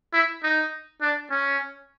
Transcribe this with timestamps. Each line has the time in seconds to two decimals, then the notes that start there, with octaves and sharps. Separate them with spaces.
0.14 E4
0.43 D#4
1.02 D4
1.31 C#4